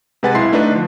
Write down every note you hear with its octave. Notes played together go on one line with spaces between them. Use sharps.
C3 G#3 B4 F#5 G#5 A6
B1 E4 C6 C7
A3 D4 D#4 B4
D3 F3